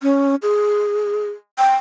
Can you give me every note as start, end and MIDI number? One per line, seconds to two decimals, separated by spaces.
0.02 0.35 61
0.42 1.28 68
1.58 1.75 79